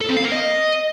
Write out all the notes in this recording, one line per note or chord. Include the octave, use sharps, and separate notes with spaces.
A4
C4
F5
A#4
D#5